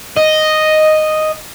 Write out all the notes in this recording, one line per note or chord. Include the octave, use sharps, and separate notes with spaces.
D#5